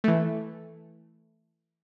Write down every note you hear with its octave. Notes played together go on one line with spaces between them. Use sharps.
E3 A3